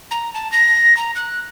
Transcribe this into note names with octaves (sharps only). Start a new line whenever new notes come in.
A#5
A5
A#6
A#5
F#6